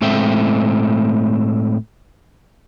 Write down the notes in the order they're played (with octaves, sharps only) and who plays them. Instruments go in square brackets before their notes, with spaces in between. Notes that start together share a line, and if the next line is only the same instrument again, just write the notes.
[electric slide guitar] A2 G#3 A3 C4 E5 G5